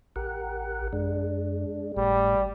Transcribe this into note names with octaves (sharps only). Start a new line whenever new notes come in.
A1 G4 A#4 F#5
F#2 G#3 D4
G#1 A2 G3